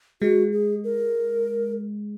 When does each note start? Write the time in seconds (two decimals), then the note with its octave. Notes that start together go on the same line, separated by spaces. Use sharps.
0.21 G#3 F#4
0.53 G#4
0.84 A#4